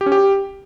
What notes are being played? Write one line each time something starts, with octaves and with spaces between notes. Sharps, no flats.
G4
C#4
G4